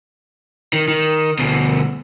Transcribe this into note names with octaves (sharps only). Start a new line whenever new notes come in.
D#3
D#3
D2 B2